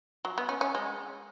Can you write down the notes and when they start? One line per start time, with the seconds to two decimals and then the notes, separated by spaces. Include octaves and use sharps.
0.25 F#3
0.38 B3
0.49 C#4
0.61 C#4
0.75 G#3